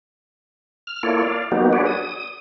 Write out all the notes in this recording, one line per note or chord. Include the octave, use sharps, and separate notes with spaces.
F6
A#3 E4 F4 A4 C#5 D5
D5 F5
F#3 A#3 B3 D#4 F#4 G4
D4 F#4 G#4 B4 C#5 D5
D#6